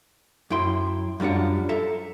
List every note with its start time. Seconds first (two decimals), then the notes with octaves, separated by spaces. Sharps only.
0.50 F#2 E4 G5 C6
1.20 F#2 G3 D4 F4 F#5
1.69 A4 E5 A5 A#5